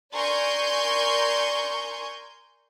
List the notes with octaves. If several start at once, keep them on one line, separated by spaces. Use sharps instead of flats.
A#4 D5 G#5 C6 C#6 G6